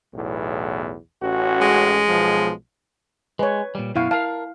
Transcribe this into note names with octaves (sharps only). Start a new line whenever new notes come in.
B1 E2 A2
A1 C#4 F#4
G#3
B1 B2 F3
G#3 B4 C#5
A#2 G3
F#2 B2 E4 F#4 F5
A#4 F5 A5